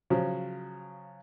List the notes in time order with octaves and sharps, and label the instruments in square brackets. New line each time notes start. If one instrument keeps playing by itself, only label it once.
[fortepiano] C#3 F3 F#3